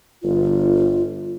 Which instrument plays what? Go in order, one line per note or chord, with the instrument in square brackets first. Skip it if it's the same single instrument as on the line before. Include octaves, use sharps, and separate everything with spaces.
[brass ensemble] G1 [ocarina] F4